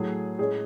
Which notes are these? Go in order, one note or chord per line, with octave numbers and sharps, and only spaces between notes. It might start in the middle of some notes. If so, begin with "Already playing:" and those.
Already playing: A2 F#3 A3 G#4
A2 G#3 C#4 G#4